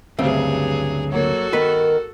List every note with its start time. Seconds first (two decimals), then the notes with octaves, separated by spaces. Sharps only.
0.19 D2 G2 C#3 F#3 C4 G#4 E5 F5
1.12 F#3 A#3 F#4 A4 C#5
1.53 D#3 B3 A#4 B4